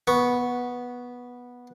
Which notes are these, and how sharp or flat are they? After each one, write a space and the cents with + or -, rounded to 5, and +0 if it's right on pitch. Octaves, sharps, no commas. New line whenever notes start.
B3 -10 C#6 +0